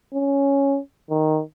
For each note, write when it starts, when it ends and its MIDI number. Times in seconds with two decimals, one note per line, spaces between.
0.14 0.79 61
1.10 1.41 51